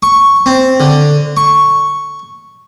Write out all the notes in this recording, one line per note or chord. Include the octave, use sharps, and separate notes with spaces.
C#6
C4
D3
C#6